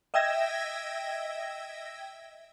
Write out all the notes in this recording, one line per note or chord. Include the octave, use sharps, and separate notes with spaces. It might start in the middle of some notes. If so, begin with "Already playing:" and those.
D#5 E5 G5 E6 G#6 A#6